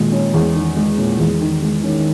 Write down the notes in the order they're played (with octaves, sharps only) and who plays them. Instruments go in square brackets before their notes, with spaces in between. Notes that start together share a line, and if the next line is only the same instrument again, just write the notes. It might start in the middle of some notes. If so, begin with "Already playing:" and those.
Already playing: [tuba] A#2 [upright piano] D#3 G#3
[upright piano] C#4
E2
D#3
G#3
[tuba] A#2 [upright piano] C#4
[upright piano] E2
D#3
G#3
[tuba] D#3 [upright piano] C#4